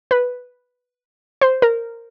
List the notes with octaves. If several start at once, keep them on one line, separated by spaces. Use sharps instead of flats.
B4
C5
A#4